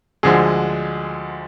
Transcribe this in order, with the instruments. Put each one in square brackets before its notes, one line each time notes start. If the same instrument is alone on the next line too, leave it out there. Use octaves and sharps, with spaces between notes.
[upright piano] D2 D3 F3 G#3 G#4